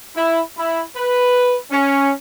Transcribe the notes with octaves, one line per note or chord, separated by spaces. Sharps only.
E4
E4
B4
C#4